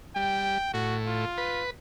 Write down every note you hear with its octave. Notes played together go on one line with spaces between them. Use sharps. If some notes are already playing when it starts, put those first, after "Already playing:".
G3 G5
A2 F#4
F4
B4